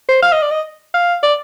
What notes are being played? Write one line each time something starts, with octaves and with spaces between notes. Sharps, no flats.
C5
F5
D#5
D5
D#5
F5
D5